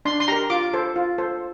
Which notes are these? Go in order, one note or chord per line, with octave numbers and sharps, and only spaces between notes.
D4 C6
C6
G4 A#4 A#5
F4 D6
A4 C5
F4
A4 C5